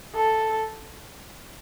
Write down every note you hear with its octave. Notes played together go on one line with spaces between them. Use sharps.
A4